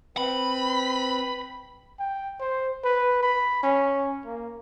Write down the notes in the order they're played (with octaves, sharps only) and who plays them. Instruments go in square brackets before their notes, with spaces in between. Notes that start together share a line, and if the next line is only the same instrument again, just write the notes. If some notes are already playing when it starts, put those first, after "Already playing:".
[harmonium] C4 B4 [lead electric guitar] B5
[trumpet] G5
C5
B4
B5
C#4
A#3